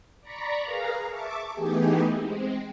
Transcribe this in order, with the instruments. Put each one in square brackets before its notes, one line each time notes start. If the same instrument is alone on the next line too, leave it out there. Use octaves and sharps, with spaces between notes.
[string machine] D5 A#5 B5 C#6
G#4 A#4 B4 F5 A#5
E5 A5 C#6 D6
E3 A3 B3 D#4 G4 G#4
G#3 C4